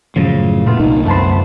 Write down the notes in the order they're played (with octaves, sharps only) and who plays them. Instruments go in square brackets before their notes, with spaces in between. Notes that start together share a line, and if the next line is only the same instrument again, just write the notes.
[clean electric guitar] F#2 A2 F3 [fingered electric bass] C#3
[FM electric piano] A#2 [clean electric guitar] A3 B3 F4
[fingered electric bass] C2 D3 [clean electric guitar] A#3 [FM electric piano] D#4
[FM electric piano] F#2 A5 B5 [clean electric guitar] A3 B3 C5